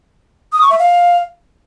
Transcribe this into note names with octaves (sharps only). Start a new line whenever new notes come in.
D#6
C#6
E5
F5